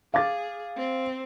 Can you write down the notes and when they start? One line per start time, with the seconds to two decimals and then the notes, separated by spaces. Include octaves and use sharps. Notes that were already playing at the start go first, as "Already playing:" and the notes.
0.14 G#4 F5 D6 A6
0.77 C4